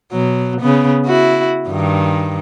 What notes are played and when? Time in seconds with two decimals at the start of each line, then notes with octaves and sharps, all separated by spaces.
0.12 B2 F#3
0.61 C#3 B3
1.06 E4 F#4
1.69 G2 D#3